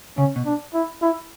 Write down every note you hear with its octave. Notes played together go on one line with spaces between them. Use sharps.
C#3 C#4
B2
D4
E4
E4